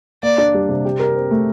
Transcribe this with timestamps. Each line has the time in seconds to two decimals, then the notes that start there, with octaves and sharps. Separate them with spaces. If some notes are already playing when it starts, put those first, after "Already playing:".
0.23 A#3 D5
0.38 D4
0.54 G3
0.69 C3
0.85 G4
0.99 A#4
1.15 C4
1.31 A3